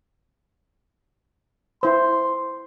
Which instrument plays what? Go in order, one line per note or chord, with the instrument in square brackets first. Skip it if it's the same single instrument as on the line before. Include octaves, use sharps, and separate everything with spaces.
[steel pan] E4 C5 [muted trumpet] C6